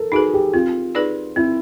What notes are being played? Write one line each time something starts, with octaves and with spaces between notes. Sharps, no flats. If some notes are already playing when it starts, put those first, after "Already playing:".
Already playing: A4 A#4
D#4 F#4 G#4 B4
G4
C4 F4
D#4 G#4 B4 D5
C4 E4